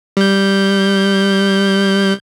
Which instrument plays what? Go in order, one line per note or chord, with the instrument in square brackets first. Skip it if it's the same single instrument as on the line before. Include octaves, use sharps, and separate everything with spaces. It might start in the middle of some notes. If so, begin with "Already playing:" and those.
[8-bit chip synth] G3 G6